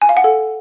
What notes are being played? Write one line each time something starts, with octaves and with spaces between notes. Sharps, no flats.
G#5
F5
F#5
A4